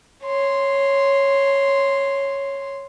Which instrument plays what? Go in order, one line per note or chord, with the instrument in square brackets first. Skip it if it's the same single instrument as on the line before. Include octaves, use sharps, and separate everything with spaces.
[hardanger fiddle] C#5 C6